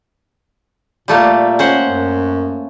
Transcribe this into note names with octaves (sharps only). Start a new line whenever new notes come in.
A#2 G3 A3 A#3
C#4 C5 F#5
F#2